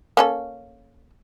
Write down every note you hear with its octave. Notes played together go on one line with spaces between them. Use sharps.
A#3 C#4 A4